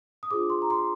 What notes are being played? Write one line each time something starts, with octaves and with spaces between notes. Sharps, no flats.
D#6
D4 F4 G#4 C5 D6
C6
A#5
C6